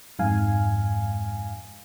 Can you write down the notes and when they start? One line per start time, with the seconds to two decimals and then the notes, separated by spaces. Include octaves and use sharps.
0.19 F2 G#2 F5 G#5